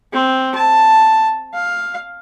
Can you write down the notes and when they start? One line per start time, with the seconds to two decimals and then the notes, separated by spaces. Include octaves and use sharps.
0.12 C4
0.54 A5
1.54 F5